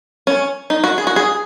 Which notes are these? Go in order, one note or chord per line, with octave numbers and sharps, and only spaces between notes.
C#4
D#4
F#4
G#4
F#4
G#4